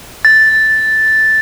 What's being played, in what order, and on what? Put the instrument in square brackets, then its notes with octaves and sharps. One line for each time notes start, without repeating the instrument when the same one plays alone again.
[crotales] A6